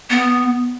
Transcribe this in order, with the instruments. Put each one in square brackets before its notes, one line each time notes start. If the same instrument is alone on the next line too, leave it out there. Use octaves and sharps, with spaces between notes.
[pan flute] B3